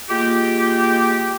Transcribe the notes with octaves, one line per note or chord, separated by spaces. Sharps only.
G#3 A#3 F4 G4